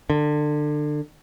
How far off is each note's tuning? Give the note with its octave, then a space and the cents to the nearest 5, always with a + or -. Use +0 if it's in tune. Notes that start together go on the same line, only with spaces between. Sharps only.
D3 +25